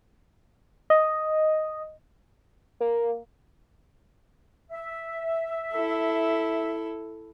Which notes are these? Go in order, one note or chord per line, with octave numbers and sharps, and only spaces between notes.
D#5
A#3
E5
E4 A4